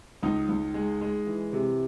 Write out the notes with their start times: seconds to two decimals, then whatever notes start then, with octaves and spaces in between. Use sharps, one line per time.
0.23 C#2 D#4
0.49 C#2
0.74 G#3
1.01 G#3
1.27 E3
1.53 C3